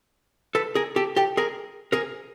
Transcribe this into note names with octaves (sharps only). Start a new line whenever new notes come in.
A4 B4
G#4 A#4
G4 A4
G4 A4
G#4 A#4
G#4 A#4